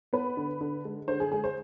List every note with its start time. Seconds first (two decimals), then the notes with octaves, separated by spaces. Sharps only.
0.13 B3 B4
0.37 D3
0.61 D3
0.85 G#3
1.08 D3 C5
1.20 G#4
1.32 G#3 G#4
1.44 C5